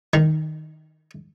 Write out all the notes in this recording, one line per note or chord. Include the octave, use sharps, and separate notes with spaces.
D#3